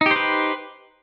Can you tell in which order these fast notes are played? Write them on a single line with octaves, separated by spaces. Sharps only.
D#4 G4 C5 B4